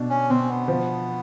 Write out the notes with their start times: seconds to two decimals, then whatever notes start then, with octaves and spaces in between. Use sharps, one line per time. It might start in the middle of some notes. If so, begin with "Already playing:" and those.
Already playing: B2 D4
0.10 C#4
0.30 B2 C4
0.49 B3
0.68 F3